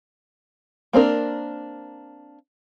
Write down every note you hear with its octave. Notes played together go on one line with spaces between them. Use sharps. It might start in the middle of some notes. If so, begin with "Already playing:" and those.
A#3 C4 D4 A#4